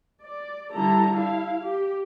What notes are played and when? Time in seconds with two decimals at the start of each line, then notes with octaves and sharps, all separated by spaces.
0.23 D5
0.73 D3 G3 E4 A4 A#5
1.18 E4 F5
1.66 G4